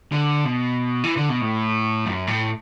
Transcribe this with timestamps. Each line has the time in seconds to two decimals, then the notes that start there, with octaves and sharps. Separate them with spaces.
0.12 D3
0.45 B2
1.04 E3
1.17 D3
1.29 B2
1.41 A2
2.06 F#2
2.27 A2